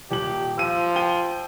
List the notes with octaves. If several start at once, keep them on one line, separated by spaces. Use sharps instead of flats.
D#1 G4 F#7
F3 E6 D#7
G5 D#7 G7